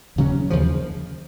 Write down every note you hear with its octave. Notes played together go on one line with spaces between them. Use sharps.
D#2 C#3 F#3 C#4
D#2 C#3 F3